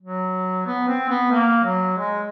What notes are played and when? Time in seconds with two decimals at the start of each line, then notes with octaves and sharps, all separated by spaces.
0.01 F#3
0.66 B3
0.88 C4
1.09 B3
1.31 A#3
1.64 F#3
1.98 G#3